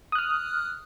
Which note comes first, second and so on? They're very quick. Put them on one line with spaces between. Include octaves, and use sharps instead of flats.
D#6 F#6 F6